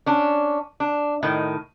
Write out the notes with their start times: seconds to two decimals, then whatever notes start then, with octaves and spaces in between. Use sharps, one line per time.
0.06 C#4 D4
0.80 D4
1.23 A2 D#3